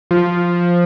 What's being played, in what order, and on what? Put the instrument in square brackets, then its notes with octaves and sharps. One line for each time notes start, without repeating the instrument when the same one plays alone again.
[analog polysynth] F3